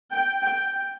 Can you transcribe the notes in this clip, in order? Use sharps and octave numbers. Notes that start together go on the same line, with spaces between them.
G5
G5